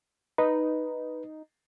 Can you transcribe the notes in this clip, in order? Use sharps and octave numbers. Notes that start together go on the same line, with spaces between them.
D#4 B4